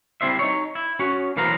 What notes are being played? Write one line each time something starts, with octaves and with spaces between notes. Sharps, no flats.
G3 C4 E4 C5 E5
D#4 C#5
E4
C#4 F#4 C#5
B1 E3 B4 C5 F5 A#5